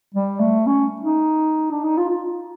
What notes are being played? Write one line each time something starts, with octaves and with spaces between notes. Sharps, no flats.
G3
A3
C#4
D#4
D4
D#4
F4
F4